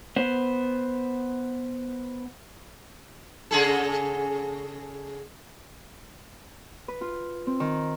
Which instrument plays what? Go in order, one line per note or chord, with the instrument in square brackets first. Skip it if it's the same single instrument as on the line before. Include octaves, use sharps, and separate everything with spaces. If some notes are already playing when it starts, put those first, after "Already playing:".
[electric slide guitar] B3 C5
[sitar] C#3 G#4 A4
[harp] B4
F4
C4
D#3